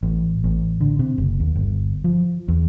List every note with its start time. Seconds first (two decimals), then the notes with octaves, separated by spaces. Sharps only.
0.03 A1
0.44 A1
0.81 D3
0.99 C3
1.18 F#1
1.40 D#2
1.55 G1
2.04 F3
2.48 E2